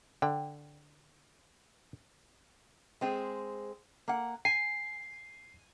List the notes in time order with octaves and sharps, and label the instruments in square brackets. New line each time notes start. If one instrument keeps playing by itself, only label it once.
[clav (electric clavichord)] D3 [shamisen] G5
[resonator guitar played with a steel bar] G#3 C4 G#4
A#3 F#5
[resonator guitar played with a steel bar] G#5 [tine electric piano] C7